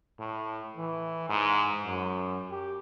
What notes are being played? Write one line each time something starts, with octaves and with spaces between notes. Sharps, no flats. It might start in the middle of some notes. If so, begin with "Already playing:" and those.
A2
E3
G#2
F#2
G4